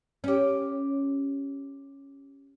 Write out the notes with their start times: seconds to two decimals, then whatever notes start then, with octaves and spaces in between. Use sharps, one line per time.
0.24 C#4 G4